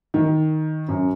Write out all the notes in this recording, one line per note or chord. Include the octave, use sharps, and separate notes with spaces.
D#3
F#2